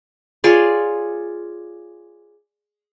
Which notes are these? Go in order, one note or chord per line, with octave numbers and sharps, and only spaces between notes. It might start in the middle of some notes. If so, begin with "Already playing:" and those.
F4 G#4 C#5 D5